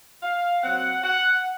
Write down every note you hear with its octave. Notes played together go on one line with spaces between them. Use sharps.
F5
A#2 F#3 C4 F#5
F#5